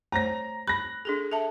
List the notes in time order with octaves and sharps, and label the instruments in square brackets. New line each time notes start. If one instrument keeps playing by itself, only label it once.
[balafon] A3 C5 C#5 [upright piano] A#5 A#6
[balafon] B5 [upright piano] F#6 A#6
[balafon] D4 G#4 A4
A4 E5 A5